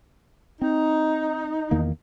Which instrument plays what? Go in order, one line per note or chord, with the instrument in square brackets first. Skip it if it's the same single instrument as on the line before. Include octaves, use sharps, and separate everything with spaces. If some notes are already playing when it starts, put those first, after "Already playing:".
[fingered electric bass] C4 [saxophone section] D#4
[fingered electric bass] E2 D#3 A#3